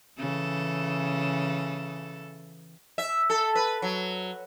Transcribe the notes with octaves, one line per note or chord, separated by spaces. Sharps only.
C#3 E3 A4
E5
A4
B4
F#3